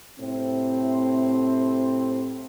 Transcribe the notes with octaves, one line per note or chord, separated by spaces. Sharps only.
A2 C3 C4